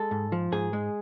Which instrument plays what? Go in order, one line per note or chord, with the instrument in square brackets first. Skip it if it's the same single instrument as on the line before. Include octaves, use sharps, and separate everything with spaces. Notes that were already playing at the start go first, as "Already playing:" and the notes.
Already playing: [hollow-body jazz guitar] G#3 A4
G#2
F3
G#2 G#4
G#3